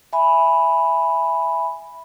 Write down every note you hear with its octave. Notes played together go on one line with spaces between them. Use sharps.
E5 G#5 B5